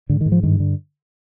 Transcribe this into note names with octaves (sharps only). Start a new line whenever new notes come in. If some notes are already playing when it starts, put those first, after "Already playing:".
G#2 D3
D#3
G#2
F3
G2 D#3
D3